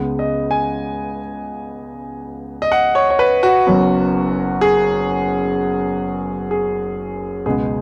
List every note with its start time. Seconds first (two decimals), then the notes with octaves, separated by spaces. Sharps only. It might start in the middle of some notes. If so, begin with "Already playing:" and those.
Already playing: C#2 C#3 G#3 B3
0.19 D#5
0.51 G#5
2.62 D#5
2.72 F#5
2.95 C#5
3.10 C#5
3.19 B4
3.43 F#4
3.67 F#1 F#2 F#3 B3
4.61 G#4
6.51 G#4
7.46 C#2 B2 G#3 B3 G#4